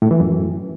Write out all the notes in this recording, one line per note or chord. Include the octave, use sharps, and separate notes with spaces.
A2
E3
F#2